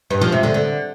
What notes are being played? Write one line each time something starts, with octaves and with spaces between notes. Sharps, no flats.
G2
F3
C3
D3
D3